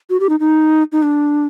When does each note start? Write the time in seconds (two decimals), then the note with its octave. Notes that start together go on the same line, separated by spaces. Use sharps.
0.10 F#4
0.20 G4
0.29 D#4
0.40 D#4
0.92 D#4
1.03 D4